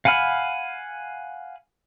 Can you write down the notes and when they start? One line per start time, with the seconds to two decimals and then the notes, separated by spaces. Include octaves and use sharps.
0.05 F5 F#5 G#5 B5 F6